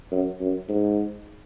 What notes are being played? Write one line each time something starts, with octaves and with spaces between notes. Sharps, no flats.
F#2
F#2
G#2